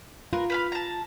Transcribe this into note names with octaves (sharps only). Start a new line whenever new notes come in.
F4 A#4 B4
B4 F5 B5
A5 A#5